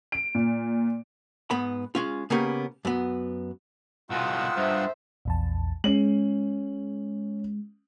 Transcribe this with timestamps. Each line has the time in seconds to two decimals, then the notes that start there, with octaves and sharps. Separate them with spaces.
0.12 D7
0.35 A#2
1.51 G#2 B3 B5
1.95 G#3 C#4 F4
2.30 C#3 A#3 B3 C#4 G4
2.85 F#2 B3
4.10 C2 F2 B2 D#3 G#3 F4 F#5 E6
4.57 G2 C5 E5
5.25 A#1 E2 A5
5.84 G#3 C#4 F#7